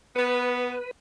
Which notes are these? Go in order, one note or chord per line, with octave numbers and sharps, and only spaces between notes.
B3 B4